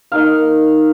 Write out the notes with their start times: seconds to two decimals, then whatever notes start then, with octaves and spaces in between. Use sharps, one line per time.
0.12 A#3 D#4 F5